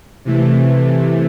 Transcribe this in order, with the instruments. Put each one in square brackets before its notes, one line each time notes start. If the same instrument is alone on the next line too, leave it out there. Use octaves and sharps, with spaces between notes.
[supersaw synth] C3 E3 A3